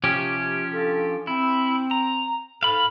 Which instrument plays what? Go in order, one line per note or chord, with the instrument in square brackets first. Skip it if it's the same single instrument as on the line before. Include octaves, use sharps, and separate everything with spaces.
[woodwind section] C3 [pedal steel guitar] F3 C#4 G4
[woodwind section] D4 F4 A4
[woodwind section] C4 [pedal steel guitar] E4
[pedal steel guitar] A#5
[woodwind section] G#2 A4 [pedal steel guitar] F5 B5